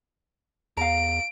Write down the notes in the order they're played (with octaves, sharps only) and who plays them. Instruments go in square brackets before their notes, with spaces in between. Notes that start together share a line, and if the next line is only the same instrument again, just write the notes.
[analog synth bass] E2 [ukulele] F5 A#5 [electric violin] D7